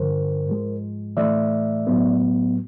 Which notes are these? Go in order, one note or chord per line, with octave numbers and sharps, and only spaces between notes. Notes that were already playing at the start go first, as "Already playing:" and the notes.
Already playing: G2 D3 F3 A#4 C5
G#2 F3 G#3
A2 E3 A3 D5 E5
A2 F#3 B3